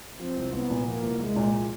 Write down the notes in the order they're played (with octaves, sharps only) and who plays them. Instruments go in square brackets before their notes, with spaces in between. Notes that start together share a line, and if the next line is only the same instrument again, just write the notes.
[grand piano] F3 [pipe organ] C4
[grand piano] C2
[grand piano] C2 [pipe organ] B3
[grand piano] A#2
[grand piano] F3 [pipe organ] A#3
[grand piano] C2
[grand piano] C2 [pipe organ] G#3
[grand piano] A#2
F3